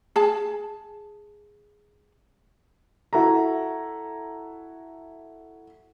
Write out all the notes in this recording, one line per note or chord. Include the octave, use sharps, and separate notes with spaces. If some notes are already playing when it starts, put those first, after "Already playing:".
G#4 A5
E4 F#4 A4 A#5